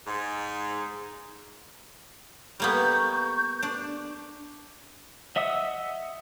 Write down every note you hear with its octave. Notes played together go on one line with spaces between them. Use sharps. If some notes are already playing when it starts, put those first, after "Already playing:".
G#2
G3 A#3 B3 C#6 G6
D4
D#5 E5 F#5 D#6 E6